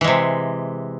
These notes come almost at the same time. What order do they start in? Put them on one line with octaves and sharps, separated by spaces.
E3 G#3 C3